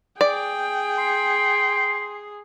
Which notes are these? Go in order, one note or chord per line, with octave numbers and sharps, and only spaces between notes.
G#4 D5 G5
C6